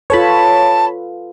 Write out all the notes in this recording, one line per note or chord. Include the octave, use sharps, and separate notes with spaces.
F4 A4 B4 C#5 A5 B5